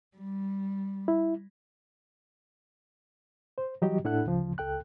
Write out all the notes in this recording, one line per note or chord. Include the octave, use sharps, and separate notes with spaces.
G3
E4
C5
E3 F#3 G3 F#4 G4 D#5
A2 D4 E4 A4 F#5 F#6
D2 C#3 F3
C#2 A4 G5 F#6